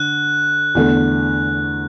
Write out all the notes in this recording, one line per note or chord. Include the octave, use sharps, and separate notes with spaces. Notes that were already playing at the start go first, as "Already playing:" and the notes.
Already playing: D3 F#6
E2 D3 A3